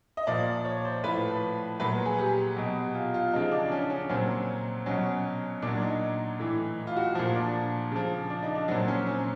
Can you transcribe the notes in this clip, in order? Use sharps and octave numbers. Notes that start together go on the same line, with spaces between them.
D#5
A#2 F3 D5
C#5
C5
A2 F3 B4
A#2 F#3 B4
G#4
G4
B2 F#3
F4
F4
C#3 F3 D#4
D4
C#4
C#4
A#2 F#3 C4
B2 F#3 C#4
A#2 F#3 D4
D#4
A2 E3
F4
F#4
A#2 F3
D4
C#3 F3
D4
D#4
D4
A#2 F#3 C4
C#4
C4